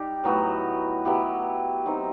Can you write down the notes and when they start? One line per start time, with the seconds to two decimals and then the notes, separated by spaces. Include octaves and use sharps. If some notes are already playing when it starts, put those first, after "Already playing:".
Already playing: G3 D#4 G4
0.24 A2 F#3 B3 F#4
1.05 F#3 B3 E4 G4
1.86 F#3 C4 D#4